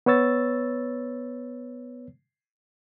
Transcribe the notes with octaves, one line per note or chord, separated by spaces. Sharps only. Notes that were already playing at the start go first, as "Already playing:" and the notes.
B3 B4 C#5 E6 A6